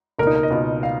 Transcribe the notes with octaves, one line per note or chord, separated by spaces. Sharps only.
C#2 B2 A#3 A#4
D#4
A#4
D#5
C#2 B2 A#3
F5